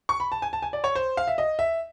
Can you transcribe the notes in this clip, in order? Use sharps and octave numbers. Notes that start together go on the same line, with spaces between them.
C#6
B5
A5
G#5
A5
G#5
D5
C#5
C5
F5
E5
D#5
E5